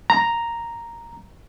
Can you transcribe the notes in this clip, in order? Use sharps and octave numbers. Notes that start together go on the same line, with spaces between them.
A#5